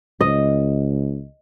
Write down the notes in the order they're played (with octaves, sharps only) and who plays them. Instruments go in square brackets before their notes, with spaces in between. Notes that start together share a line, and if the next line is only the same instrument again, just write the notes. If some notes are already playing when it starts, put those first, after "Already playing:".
[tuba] C#2 [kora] D#5